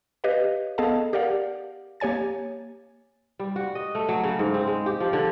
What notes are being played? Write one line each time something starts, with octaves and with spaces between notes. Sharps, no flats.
G4 B4 C#5 D#5 F5
B3 G#4 A4 D#5 F5 A5
G4 A#4 D5 F5 F#5
A#3 G4 C#5 G#5 A6
G3
F#4
D#5
A3
F#3
C#3
G#2
C4
G#3
G4
F3
D3